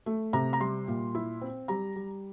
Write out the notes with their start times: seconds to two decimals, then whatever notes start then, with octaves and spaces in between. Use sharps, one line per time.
0.06 A3
0.33 C3 A#5
0.53 A#5
0.60 G3 C6
0.88 A#2
1.15 E4
1.41 C4
1.68 G3 A#5
1.96 G3